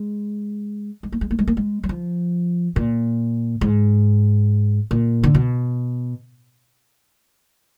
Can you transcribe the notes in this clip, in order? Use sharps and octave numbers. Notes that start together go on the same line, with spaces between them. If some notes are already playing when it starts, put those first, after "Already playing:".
Already playing: G#3
G#3
A#3
G#3
A#3
G#3
A#3
G#3
F#3
F3
A#2
G#2
A#2
D3
B2